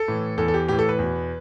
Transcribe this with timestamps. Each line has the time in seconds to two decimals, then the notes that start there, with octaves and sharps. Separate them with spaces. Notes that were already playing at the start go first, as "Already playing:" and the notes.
Already playing: A4
0.08 A2 E3
0.37 E2 E3 A4
0.48 A4
0.54 G4
0.68 A2 E3 G4
0.79 A4
0.89 B4
0.99 E2 B2